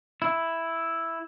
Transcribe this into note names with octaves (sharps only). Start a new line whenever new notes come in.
E4